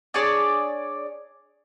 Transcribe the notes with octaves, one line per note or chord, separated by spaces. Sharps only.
D4 G#4 C#5 D5